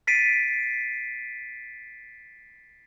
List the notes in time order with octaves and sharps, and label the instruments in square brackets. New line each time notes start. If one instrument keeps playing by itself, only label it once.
[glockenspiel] A6 B6 C7 D7 D#7